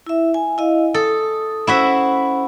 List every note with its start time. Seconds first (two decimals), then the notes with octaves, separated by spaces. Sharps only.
0.06 E4 E5
0.34 G#5
0.58 E4 D#5 F5
0.94 A4 D#6
1.67 C#4 E4 F#4 C5 E5